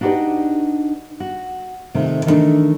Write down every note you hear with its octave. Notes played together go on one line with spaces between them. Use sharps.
D4 D#4 F#4 G4 B4 D5
F#4
C3 D#3 A3 F4
D#3 E3 G3 A3 D4 D#4